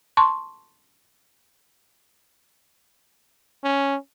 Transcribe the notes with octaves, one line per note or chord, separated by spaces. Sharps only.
A5 C6 C#6
C#4